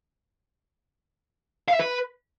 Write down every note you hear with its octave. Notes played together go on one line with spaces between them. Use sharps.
F5
E5
B4